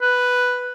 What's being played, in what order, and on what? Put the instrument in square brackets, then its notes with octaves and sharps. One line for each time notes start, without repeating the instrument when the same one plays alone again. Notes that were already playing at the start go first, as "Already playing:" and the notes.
[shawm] B4